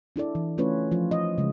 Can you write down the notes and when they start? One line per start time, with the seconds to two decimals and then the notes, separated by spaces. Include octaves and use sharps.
0.16 D4 E4 A4 D5
0.35 E3
0.58 A3 C#4 F4 B4 C#5
0.92 F3 F4
1.11 D#5
1.38 C#3 G#3